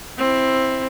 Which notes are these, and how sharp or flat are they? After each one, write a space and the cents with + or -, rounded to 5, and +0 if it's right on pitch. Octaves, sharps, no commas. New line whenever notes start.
C4 +10 E4 +0